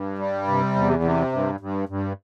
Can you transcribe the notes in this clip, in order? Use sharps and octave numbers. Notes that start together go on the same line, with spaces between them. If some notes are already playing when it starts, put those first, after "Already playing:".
Already playing: G2
G3
C3
E2
C3
G2
G2
G2